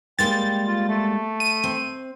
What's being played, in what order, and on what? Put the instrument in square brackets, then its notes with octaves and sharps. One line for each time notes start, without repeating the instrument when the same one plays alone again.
[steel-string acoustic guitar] G3 G#3 A#3 [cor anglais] G5 [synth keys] A6
[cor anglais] F4
A3
[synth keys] D#7
[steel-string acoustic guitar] C4